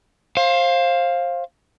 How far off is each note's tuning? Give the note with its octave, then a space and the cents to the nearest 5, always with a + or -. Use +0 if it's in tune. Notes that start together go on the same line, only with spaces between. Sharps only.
C5 +25 F5 +0